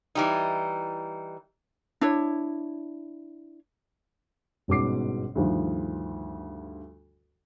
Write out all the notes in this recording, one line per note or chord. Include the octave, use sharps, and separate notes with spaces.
E3 G3 D#4
D4 E4 C#5
G1 G#2 B2 C#4 D6 C7
D2 G2 D#3 F3